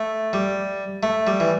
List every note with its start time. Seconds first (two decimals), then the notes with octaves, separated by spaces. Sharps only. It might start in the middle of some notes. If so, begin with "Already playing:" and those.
Already playing: A3
0.33 G3
1.03 A3
1.27 G3
1.40 E3